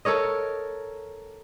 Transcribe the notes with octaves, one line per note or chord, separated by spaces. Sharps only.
A4 A#4 C#5 D#5